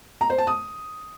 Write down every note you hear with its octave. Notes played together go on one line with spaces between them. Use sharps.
A#5
C5
A5
D#6